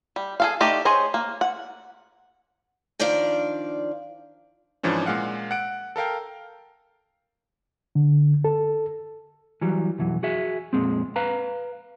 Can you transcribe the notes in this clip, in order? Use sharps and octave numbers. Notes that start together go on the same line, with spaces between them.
G3
G#4 A4 F5
A3 D#4 G4 D5 D#5
G#4 C5 C#5 D#5
A#3
F#5
D#3 F3 D4 D5 F5
G#2 E3 F3 C#4 D4
A#2 G#3 F5 F#5
F#5 D7
A4 A#4 F5 G5
D3
A4
E3 F#3 G3
B1 F2 E3 F#3
F#4 G#4 E5
F2 A#2 G#3 C4
B4 F5 A#5